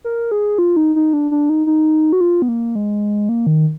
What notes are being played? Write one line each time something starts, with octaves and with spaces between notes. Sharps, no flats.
A#4
G#4
F4
D#4
D#4
D4
D4
D#4
D#4
F#4
F4
B3
A#3
G#3
A#3
D#3